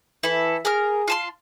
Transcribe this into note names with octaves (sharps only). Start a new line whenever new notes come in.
E3 E4 A4
G#4 A#4 F6
F4 A5 C6